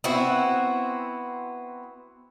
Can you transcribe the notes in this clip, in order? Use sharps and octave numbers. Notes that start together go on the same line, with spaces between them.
B3 C4 E4 F#4